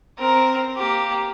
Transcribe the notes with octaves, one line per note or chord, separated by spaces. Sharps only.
C4 A#4
A#3 G4